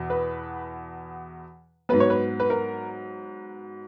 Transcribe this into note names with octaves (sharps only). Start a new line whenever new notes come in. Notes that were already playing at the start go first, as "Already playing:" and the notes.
Already playing: E2 B2
B4
G#2 F#3 B3 B4
C#5
B4
B4
A#4